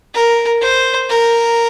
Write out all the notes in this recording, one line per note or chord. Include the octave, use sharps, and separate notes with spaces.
A#4
C5
A#4